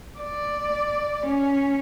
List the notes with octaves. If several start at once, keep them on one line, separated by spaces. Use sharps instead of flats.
D5
C#4